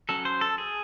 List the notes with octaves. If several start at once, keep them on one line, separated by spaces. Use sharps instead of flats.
F#3 C#4 A4
C5
A4
G#4